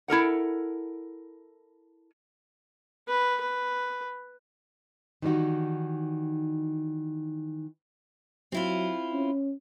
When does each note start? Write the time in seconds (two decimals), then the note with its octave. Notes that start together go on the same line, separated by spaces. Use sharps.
0.08 E4 A4 A#4 F#5
3.08 B4
3.40 B4
5.22 D#3 E3 G3 D#4 F#4
8.52 F#3 C4 E4 F4
9.13 C#4